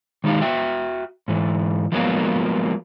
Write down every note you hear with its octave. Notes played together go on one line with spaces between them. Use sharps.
D#3 G#3 D#4 G4 F5
F#4 E5 G5
G#2 E3
F3 F#3 G#3 A#3 B3